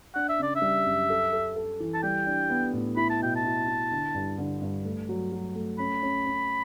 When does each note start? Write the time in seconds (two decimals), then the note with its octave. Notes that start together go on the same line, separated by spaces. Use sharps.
0.15 D4 F#5
0.29 E5
0.39 C#3 D5
0.56 E5
0.62 G3
0.86 F#2
1.10 A4
1.33 A4
1.56 A4
1.80 E3
1.94 A5
2.03 G3 G5
2.26 D4
2.50 B3
2.73 A2
2.97 E4 B5
3.10 A5
3.21 B2 G5
3.36 A5
3.44 E4
3.68 E4
3.91 D3
4.14 G2
4.38 D3
4.62 G2
4.85 A3
5.09 F#3
5.32 F#3
5.56 A3
5.79 C#4 B5
6.03 C#4
6.26 C#4